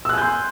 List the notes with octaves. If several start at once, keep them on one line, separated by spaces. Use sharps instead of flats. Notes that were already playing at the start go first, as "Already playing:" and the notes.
G#5 C6 E6 F#6 G6